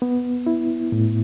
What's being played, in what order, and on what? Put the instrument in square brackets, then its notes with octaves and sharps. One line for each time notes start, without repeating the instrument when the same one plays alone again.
[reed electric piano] B3
E4
A2